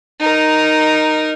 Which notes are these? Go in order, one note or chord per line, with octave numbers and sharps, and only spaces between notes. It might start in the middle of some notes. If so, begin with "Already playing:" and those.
D#4 A#4